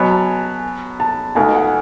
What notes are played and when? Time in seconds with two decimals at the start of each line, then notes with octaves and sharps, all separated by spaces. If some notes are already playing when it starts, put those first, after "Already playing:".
Already playing: B2 F#3 B3 G#5
0.10 A5
1.00 A5
1.35 C#2 B2 A3 D#4 G#5
1.54 F#5